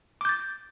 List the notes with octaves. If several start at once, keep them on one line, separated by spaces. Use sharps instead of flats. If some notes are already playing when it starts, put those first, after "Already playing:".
D6 G6 A6